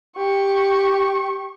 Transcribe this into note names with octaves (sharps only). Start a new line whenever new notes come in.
G4 C#6